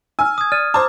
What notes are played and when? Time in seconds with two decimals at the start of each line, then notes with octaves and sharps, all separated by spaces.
0.19 G#5 E6 F6
0.38 D#6 G#6
0.52 D5 F6 A6 D#7
0.74 C5 A5 A#5 D6